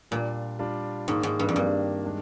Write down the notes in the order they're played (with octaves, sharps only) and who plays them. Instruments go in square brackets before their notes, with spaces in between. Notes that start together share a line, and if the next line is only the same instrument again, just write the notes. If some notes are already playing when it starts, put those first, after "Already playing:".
[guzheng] A#2 [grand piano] G3 D4 F4
[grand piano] G3 D4 F4
[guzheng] G#2 [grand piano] D#3 A#3 D4
[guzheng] G#2
G2
F2
[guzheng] G2 [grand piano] D#3 A#3 D4
[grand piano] D#3 G#3 D4